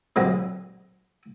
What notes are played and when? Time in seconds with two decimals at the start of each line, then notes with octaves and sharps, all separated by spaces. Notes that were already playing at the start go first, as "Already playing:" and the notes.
0.16 D2 A#2 F#3 G#3 C4